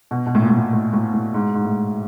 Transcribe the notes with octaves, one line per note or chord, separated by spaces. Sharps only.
B2
B2
A2
A#2
A2
A#2
A2
A2
A2
G#2
G#2
A2